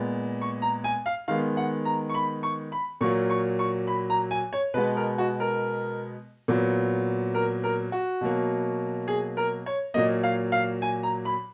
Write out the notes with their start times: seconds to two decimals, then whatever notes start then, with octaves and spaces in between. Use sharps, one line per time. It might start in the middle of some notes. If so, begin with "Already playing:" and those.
Already playing: A#2 G#3 B3
0.41 C#6
0.62 A#5
0.84 G#5
1.06 F5
1.28 D#3 G#3 B3 F5
1.57 F#5
1.85 A#5
2.09 C#6
2.14 B5
2.43 C#6
2.72 B5
3.01 A#2 F#3 A#3 C#6
3.30 C#6
3.59 C#6
3.87 B5
4.10 A#5
4.31 G#5
4.53 C#5
4.74 B2 G#3 B3 B4
4.96 A#4
5.18 F#4
5.40 A#4
6.48 A#2 F#3 B3
7.34 A#4
7.64 A#4
7.92 F#4
8.21 B2 F#3 A#3
9.08 G#4
9.37 A#4
9.66 C#5
9.94 A#2 F#3 A#3 D#5
10.23 F5
10.52 F5
10.82 G#5
11.03 A#5
11.25 B5